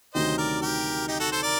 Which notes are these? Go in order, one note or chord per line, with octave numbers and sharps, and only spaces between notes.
D2 C3 D#3 F#3 C5 D#5
A#4 D5
G4 A#4
D#4 G4
F#4 A4
A4 C5
A#4 D5